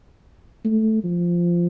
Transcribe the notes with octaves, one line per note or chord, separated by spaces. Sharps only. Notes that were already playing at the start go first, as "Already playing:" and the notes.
A3
F3